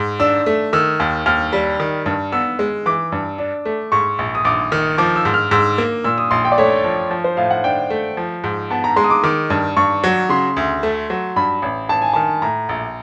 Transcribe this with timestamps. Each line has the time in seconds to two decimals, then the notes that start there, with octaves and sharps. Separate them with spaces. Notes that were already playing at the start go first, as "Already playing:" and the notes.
Already playing: G#2
0.20 D4 E6
0.46 A3
0.73 D#3 E6
1.00 D#2
1.26 D#2 F6
1.53 G3
1.80 D#3
2.06 G2
2.32 B3 E6
2.59 G#3
2.86 E3 D6
3.12 G2
3.38 D4
3.65 A3
3.92 G#2 C#6
4.19 A#1
4.35 D#6
4.45 A#1 D6
4.72 D#3
4.98 F3 D6
5.16 E6
5.25 G#2
5.34 F6
5.51 G#2 E6
5.78 A#3
6.04 A#2 E6
6.18 D#6
6.31 A#1 C6
6.45 G5
6.52 D5
6.58 A3 C#5
6.84 F3
7.11 F3
7.24 C5
7.37 A2 F5
7.51 F#5
7.64 D4 G5
7.90 A3
8.17 F3
8.44 G#2
8.70 B3 A5
8.84 A#5
8.96 G#3 C6
9.04 D#6
9.10 D6
9.24 D#3 D6
9.50 G2
9.76 G2 C#6
10.04 F#3
10.29 C#3 C6
10.57 D2
10.83 A3
11.10 F#3
11.36 G2 B5
11.62 A1
11.89 A1 A5
12.02 G#5
12.14 D#3 A5
12.42 A2 A#5
12.69 A#1